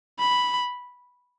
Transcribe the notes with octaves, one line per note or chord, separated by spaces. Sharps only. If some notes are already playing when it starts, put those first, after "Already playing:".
B5